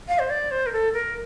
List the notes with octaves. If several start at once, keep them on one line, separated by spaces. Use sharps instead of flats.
F5
C5
D5
C5
A#4
A4
A#4